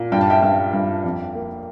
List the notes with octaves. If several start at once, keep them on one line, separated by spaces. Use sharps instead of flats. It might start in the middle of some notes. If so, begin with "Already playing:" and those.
Already playing: A#2
G2 G5
A5
E5 G5
G2
G2
F2
A#3